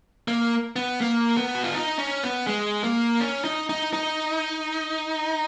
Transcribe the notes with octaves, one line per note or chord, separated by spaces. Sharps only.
A#3
B3
A#3
B3
F#4
F4
D#4
C#4
B3
G#3
A#3
C#4
D#4
D#4
D#4